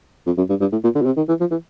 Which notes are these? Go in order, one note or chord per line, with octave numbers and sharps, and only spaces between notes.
F2
F#2
G2
G2
A2
A#2
D3
B2
C3
D#3
E3
F3
E3